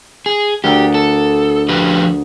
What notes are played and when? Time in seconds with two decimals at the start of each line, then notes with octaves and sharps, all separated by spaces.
0.26 G#4
0.64 D2 G4 A#4
0.94 A4
1.69 F3 G4 B4